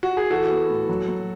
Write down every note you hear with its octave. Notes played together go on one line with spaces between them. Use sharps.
F#4
G#4
E3 F#4 A4
B3
A2
F#3
F#3